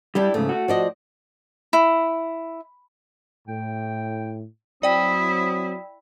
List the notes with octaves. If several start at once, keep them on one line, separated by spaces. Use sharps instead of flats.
G3 D4 E4 G4
G#2 C#3 A3
F#4
F3 D5 D#5
E4
A2 G5
F#3 C4 E4 D5 G5 D#6